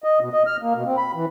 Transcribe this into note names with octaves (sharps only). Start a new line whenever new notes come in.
D#5
B2
D#5
F6
A#3
B2
C4
B5
E3